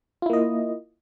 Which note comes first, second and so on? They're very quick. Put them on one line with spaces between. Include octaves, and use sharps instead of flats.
F4 E4 A#3 D#5